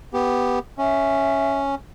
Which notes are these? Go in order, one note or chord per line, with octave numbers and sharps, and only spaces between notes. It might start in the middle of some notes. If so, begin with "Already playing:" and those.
B3 G4
C#4 E5